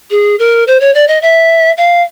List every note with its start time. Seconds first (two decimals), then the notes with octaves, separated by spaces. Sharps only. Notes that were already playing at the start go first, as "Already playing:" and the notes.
0.11 G#4
0.39 A#4
0.67 C5
0.80 C#5
0.95 D5
1.08 D#5
1.22 E5
1.77 F5